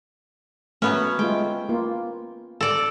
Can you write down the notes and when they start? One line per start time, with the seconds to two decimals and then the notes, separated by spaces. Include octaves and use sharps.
0.82 F#3 A3 B3 C#4
1.19 G#3 A3 F4 G5
1.69 A#3 F4
2.61 A4 D5